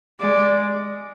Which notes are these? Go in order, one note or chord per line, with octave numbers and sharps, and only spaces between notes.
G#3 D5